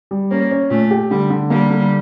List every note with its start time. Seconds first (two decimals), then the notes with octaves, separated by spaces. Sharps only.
0.11 G3
0.31 A#3 C#4
0.51 C#4
0.70 A#2 A3
0.91 G4
1.10 D3 G3
1.30 D3
1.50 G3 A#3
1.70 D3